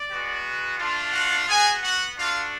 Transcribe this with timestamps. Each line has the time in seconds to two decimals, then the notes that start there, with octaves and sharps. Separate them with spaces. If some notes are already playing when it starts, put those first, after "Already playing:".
Already playing: D5
0.09 G#3 B3 F#4
0.78 A3 D4 F4
1.13 F#4 F#5
1.47 B3 F#4 G#4 G#5
1.82 F#4 F#5
2.16 A3 D4 F4 F#4 F5